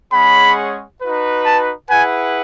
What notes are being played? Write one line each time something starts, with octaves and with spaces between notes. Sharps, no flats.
G#3 C#4 G#4 C#5 F#5 B5
D#4 F#4 B4
A5
E4 G#4 B4 F#5 G#5